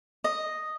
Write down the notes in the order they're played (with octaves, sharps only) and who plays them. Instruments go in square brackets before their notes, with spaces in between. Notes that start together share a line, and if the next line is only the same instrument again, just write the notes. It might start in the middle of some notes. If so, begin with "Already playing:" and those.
[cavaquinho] D#5